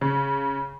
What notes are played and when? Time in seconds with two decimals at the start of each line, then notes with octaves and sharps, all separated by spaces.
0.01 C#3